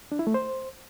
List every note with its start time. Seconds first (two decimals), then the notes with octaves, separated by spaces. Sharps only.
0.12 D4
0.19 E4
0.27 A3
0.34 C5